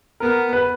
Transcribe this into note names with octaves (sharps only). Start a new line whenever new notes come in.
B3 A#4
B4